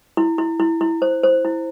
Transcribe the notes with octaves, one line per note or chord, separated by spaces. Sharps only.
E4
E4
E4
E4
C5
C5
E4